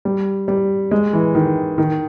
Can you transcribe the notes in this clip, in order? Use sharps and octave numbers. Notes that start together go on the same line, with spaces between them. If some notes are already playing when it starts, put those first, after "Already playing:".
G3
G3
G#3
E3
D#3
D#3